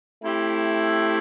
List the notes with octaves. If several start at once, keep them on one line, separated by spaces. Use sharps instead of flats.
A3 C4 E4 G4